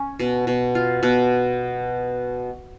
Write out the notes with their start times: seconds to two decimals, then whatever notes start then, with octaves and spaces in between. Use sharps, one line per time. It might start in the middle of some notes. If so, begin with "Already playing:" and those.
Already playing: C#4
0.20 B2
0.47 B2
0.75 F4
1.03 B2